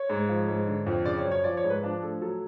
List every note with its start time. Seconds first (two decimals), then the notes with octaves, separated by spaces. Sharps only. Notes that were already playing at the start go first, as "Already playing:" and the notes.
Already playing: C#5
0.09 G#2
0.29 F3
0.48 G#2
0.67 D3
0.86 F2
1.05 C#3 D5
1.18 C#5
1.25 F#2
1.31 C#5
1.44 F3 D5
1.57 C#5
1.64 G#2
1.70 B4
1.83 F3 D4
2.02 A2 A4
2.21 F#3 A4